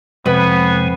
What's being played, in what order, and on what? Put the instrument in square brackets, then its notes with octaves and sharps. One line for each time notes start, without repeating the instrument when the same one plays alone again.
[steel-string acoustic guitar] F2 [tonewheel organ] C3 G#3 [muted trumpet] B3 [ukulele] B4